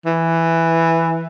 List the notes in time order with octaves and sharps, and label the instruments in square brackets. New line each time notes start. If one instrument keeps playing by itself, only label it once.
[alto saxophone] E3